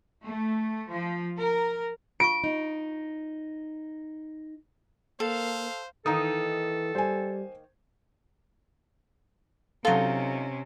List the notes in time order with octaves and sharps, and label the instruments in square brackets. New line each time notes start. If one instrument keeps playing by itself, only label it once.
[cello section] A3
F3
A#4
[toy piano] F4 F5 C#6 [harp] D7
[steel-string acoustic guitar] D#4
[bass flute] A#3 [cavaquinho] A4 [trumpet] C5 [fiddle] F5
[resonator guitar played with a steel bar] D#3 A#3 D#4 [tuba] E3 [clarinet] A4 [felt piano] A#5 D#6
[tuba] G3 [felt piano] C5 G#5
[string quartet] C3 C#4 [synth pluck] F#3 A4 [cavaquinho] D#4 F4